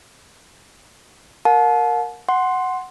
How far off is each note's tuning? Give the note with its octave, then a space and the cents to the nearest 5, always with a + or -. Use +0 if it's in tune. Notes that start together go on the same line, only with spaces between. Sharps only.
A#4 +0 F#5 -40 A5 -30
F#5 +0 C6 +0